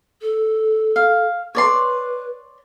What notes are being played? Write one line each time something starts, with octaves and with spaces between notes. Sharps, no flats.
A4
F5
B4 C#5 D5 C6